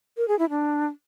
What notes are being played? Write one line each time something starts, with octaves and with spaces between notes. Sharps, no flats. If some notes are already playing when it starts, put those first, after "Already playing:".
A#4
G#4
E4
D4